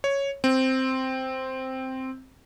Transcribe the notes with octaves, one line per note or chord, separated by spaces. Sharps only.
C#5
C4